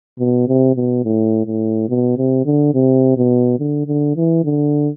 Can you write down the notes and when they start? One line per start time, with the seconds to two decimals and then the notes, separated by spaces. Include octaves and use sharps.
0.19 B2
0.48 C3
0.76 B2
1.05 A2
1.46 A2
1.89 B2
2.18 C3
2.46 D3
2.74 C3
3.17 B2
3.59 D3
3.87 D3
4.16 E3
4.44 D3